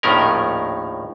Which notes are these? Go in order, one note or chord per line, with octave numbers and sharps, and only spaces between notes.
A#1 D#2 A2 D#3 C#4 A#4